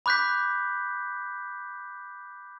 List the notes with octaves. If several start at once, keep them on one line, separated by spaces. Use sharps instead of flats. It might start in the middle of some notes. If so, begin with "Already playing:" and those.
B5 D6 F#6 G6 B6